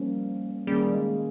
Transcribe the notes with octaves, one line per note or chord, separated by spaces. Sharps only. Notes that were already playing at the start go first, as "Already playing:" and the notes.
Already playing: F3 G3 A#3 C#4
D#3 G3 A#3 C#4 G#4
G#3